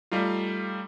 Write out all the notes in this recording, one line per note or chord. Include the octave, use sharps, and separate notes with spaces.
G3 A3 D#4 F4